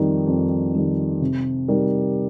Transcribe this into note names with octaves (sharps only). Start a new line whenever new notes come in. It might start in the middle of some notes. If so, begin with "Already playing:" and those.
Already playing: F2 D#3 G3 D#4
F2
D#3 G3 D#4
C3
G3 D#4 G4 A#4